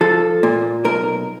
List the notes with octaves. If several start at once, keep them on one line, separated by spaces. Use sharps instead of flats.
F3 A4
A#2
B1 A#4